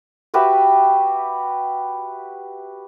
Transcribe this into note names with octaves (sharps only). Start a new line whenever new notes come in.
F#4 G4 B4 E5